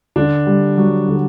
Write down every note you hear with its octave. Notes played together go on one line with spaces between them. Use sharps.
D3 D4
G3
F#3 G3 F#4
D3